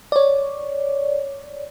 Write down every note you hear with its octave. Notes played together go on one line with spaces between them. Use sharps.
C#5 D5